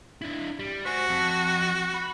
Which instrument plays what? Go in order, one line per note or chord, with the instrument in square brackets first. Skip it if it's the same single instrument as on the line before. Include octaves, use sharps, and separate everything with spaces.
[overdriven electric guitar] D4 E4
G3
[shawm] F#4 [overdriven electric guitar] C5 G#5
[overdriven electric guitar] F2
B5